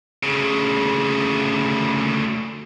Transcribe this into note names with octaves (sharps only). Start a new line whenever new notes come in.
D2 C#3